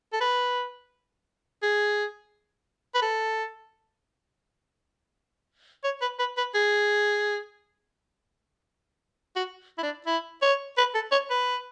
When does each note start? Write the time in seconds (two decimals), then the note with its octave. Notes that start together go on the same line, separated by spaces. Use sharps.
0.13 A4
0.21 B4
1.62 G#4
2.95 B4
3.02 A4
5.84 C#5
6.01 B4
6.19 B4
6.37 B4
6.55 G#4
9.36 F#4
9.78 E4
9.83 D4
10.06 E4
10.42 C#5
10.78 B4
10.94 A4
11.12 C#5
11.30 B4